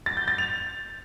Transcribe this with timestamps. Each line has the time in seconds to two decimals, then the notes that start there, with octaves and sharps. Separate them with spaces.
0.06 A6
0.17 G6
0.28 A6
0.38 F7